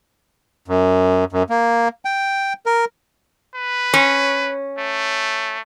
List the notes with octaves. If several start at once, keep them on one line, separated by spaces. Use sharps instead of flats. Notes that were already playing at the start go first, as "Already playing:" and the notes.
F#2
F#2
A#3
G5
A#4
B4
C#4
A3